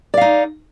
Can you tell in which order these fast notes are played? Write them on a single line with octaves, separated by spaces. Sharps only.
D5 F5 D#4